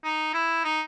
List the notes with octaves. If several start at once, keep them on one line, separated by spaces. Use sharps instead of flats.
D#4
E4
D#4